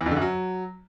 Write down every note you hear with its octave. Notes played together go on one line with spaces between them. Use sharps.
E2
F2
D3
F#2
F#3